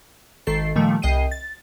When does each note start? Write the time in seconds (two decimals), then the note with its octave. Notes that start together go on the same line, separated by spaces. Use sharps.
0.47 G#1 D#3 A4 C7
0.76 A#2 D#3 F3 G3 A3
1.02 C2 D#5 G5 C7 D#7
1.31 A6